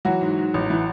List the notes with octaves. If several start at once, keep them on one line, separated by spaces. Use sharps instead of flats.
E3 F#3 F#4
G#2
G#2
A1
E3